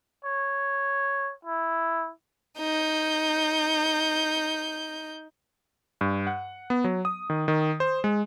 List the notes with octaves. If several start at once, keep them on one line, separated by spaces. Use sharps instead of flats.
C#5
E4
D#4 G6
G2
F#5
B3
F#3
D#6
D#3
D#3
C5
G#3